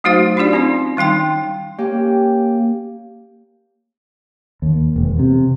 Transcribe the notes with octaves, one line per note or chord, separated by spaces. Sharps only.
F#3 A3 D#4 F#4 C5 F5
D4 D#4 F4 G4 D5
C4 C#4 D#4
D#3 G3 D#4 G5 C6
A#3 C#4 G4
D#2
E1
C3